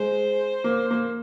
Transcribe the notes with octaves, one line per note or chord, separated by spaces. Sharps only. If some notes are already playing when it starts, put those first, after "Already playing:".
Already playing: G#3 C5
A#3
A#3